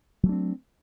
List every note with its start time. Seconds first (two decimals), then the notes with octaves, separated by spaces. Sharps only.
0.23 F#3
0.26 A3
0.29 D4
0.32 C4